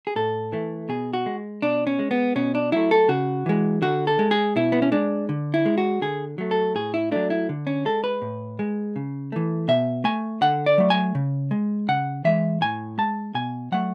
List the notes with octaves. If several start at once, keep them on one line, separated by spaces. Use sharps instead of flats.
G#4
A2 A4
E3 A3
B2 G#4
F#4
G#3
B2 D4
C#4
G#3
B3
B2 C#4
D4
F#3 A3 E4
A4
C#3 F#4
E3 G#3
D3 F#4
A4
G#3
G#4
B2 E4
B3
C#4
G#3 D4
D3
E4
G#3
F#4
D3 G#4
F#3 A3
A4
A2 G#4
E4
F#3 A3 D4
E4
D3
C#4
G#3 A4
B4
A2
G#3
C#3
E3 A3
B2 E5
A3 G#5
D3 F#5
D5
F#3 A3
G#5
C#3
G#3
C#3 F#5
E3 G#3 E5
A2 G#5
G#3 A5
B2 G#5
F#3 A3 F#5